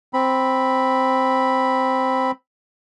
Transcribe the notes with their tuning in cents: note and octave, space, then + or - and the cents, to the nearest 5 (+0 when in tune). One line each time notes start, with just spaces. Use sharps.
C4 +0 B5 +0